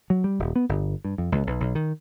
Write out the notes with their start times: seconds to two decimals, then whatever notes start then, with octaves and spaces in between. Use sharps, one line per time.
0.10 F#3
0.24 G3
0.39 D#1
0.56 B3
0.69 G1
1.04 G2
1.18 F2
1.32 C#2
1.47 B1
1.60 B1
1.75 D#3